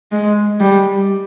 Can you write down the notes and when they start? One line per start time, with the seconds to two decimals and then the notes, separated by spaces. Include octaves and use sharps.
0.12 G#3
0.60 G3